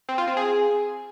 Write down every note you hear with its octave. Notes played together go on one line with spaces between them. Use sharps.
C4
F4
C4
G#4